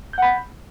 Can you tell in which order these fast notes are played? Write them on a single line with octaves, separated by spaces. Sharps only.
G6 F#5 B5